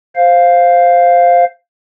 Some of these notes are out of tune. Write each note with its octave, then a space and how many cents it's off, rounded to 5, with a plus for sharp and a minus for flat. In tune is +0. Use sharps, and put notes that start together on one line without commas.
C5 +0 F5 +0